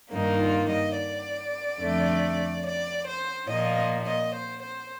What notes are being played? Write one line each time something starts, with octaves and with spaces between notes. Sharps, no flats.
G2 D#3 A#3 D#4
F4
D#5
D5
F2 D3 A3
D5
C5
A#2 F3 A#3 D#5
D#5
C5
C5